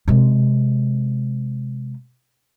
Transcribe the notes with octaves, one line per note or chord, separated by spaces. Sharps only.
C3 G#3